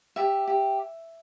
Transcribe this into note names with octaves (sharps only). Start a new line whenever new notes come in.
G4 E5
G4